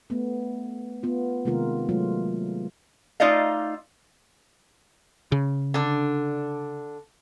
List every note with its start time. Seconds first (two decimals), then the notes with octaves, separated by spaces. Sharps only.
0.10 A3 B3
1.03 B3 F4
1.45 C3 D#3 G#3 A#3 F4 A#4
1.89 C3 F#3 G#3 A3 F4
3.20 A3 D#4 F4 D5 D#5 F5
5.32 C#3
5.74 D3 D4